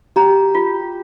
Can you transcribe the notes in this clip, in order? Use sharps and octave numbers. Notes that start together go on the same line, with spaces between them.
G4 A#5
F4